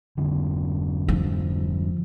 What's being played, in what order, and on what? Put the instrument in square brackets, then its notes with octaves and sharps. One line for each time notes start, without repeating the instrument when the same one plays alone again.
[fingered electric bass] F1 D3
[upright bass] F3